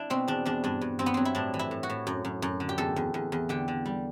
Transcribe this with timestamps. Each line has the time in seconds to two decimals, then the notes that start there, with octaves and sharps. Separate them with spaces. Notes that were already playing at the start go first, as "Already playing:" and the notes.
Already playing: D4 E4
0.10 B2 C4
0.28 E2 D4
0.45 E2 D4
0.64 G2 D4
0.81 G2
0.99 G2 C4
1.06 B3
1.14 F#3 C4
1.25 E4
1.35 A2 D4
1.54 E3
1.59 E4
1.71 A2
1.83 F#4
1.89 A2
2.07 F#2
2.25 F#2
2.42 F#2
2.60 D3
2.69 G4
2.78 E2 A4
2.96 E2
3.14 E2
3.32 E2
3.49 D3 G4
3.68 D3
3.86 G3